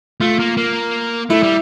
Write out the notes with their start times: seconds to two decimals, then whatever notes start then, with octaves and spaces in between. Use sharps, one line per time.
0.21 A3 F4
0.39 A#3
0.57 A#3
1.30 A3 E4
1.43 G3